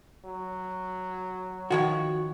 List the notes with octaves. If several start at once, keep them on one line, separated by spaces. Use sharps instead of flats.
F#3
D#3 F3 F#4 C#5